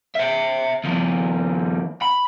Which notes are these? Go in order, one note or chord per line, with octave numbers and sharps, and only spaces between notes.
E5 G5
D#2 F3
B5